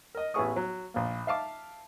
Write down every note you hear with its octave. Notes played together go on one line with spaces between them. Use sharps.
A#4 D#5
A1 B3 E4 G#4 C#6 D#6
F#3
A#1 A#3
E5 F5 A5 D6